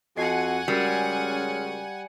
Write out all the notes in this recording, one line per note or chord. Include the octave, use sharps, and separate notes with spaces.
F2 F#4 D#5 F#5 G#5 C7
C#3 G3 G#3 C#4 F#4 A#4 C7